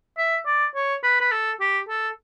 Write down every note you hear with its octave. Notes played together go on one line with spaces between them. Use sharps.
E5
D5
C#5
B4
B4
A4
G4
A4